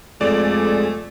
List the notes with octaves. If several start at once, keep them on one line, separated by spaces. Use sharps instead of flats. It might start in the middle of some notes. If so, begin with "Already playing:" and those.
F2 G#3 A3 G#4 D5